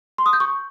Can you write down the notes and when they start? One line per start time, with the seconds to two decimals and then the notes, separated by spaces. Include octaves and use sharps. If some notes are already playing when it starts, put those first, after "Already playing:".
0.18 C6
0.26 D#6
0.33 G6
0.40 C#6